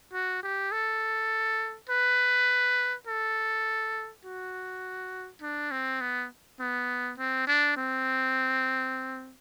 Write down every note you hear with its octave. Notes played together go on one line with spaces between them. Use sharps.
F#4
G4
A4
B4
A4
F#4
D4
C4
B3
B3
C4
D4
C4